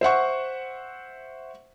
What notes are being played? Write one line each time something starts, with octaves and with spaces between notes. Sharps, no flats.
C5 E5 F#5 C#6